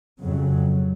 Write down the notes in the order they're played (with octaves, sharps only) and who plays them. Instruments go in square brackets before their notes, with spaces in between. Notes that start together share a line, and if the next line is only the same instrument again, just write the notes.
[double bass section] F2 C#3 F#3